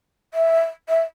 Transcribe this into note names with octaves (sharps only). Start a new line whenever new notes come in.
E5
E5